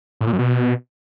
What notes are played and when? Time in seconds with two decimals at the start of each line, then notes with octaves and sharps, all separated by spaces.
0.21 A2
0.27 A#2
0.33 F#2
0.39 B2